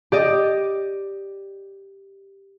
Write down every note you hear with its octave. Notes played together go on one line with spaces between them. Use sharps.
G4 D5 D#5